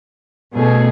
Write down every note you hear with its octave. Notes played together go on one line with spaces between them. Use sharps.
B2 A3 C#4 G#4